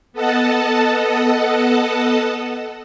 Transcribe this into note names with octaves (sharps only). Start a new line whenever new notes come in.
B3 A4 D#5 F#5 A5